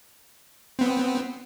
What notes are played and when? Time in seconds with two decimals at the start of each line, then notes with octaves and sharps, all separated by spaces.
0.79 B3 C4